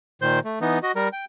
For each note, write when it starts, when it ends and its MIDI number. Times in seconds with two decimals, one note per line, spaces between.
0.22 0.39 46
0.22 0.39 51
0.22 0.39 72
0.22 0.39 91
0.45 0.59 57
0.61 0.79 52
0.61 0.79 59
0.61 0.79 63
0.83 0.92 66
0.83 0.92 75
0.96 1.08 55
0.96 1.08 70
1.13 1.25 79